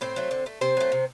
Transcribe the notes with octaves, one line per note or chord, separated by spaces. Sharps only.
A2 C4 C5
F#3 A3
D3
A3
C3 C4 C5
F#3 A3
C3